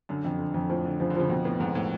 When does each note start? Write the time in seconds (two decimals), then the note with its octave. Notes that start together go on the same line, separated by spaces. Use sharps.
0.09 F#2 D3
0.25 F2
0.39 D3
0.54 F2
0.70 A2 F3
0.85 D3
1.00 C#3 F3
1.10 D3
1.15 C#3 F3
1.29 F2 B2
1.44 A2 B3
1.60 F2 G#2
1.75 A2